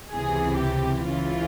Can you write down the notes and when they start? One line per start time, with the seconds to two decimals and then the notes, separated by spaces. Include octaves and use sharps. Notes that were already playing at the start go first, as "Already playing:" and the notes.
0.10 C#2 C3 E3 G#4
0.59 G4
1.08 C#2 C#3 E3 F4